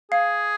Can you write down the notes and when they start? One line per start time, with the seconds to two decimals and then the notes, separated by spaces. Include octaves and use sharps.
0.12 G#4 F5